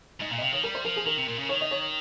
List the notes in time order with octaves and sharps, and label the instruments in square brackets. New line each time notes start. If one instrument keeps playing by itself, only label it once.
[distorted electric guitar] G#2 [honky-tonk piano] D#5
[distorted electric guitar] A#2 [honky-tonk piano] F5
[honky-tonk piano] D#5
[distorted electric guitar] C3 [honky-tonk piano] F5
[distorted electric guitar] D#3 [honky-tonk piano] C#5
[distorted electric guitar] G3 [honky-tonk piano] A#4
[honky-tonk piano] C5
[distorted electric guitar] F3 [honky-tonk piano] A#4
[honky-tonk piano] G#4
[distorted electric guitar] D#3 [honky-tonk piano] A#4
[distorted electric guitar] C3
A#2
C#3
[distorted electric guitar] D#3 [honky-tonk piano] C#5
[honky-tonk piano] D#5
C#5